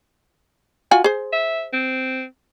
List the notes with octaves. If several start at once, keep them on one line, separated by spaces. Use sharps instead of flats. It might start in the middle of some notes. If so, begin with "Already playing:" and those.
F4 F#4 G#5
G#4 C5
E5
C4